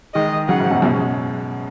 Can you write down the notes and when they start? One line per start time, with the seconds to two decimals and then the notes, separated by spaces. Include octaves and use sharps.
0.14 D#3 G#3 D#5
0.49 C#3 F#3 F#5
0.60 G#2
0.71 F#2 B2
0.82 F#2 B2
0.93 G#3 C#4